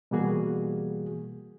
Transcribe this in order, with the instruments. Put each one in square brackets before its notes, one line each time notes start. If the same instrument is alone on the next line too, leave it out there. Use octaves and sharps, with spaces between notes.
[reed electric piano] B2 E3 G3 A#3 F#4 G#4